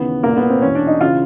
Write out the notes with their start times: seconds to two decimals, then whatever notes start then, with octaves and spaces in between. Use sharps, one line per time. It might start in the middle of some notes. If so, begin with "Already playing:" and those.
Already playing: D#2 C#3 E3 B3
0.23 C2 A#2 A#3
0.37 B3
0.50 C4
0.62 E2 B2 C#4
0.75 D4
0.87 D#4
1.00 C#3 E3 F4